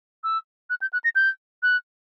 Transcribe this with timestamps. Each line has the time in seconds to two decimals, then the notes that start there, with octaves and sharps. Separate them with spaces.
0.24 E6
0.70 F#6
0.81 G6
0.93 F#6
1.04 A#6
1.15 G6
1.63 F#6